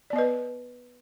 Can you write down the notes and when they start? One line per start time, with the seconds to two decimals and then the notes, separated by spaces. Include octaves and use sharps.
0.10 D5
0.13 B3
0.16 D#5
0.18 B4